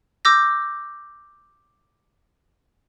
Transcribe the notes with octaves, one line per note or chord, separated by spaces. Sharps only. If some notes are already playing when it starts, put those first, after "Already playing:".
D6 E6 G6 A#6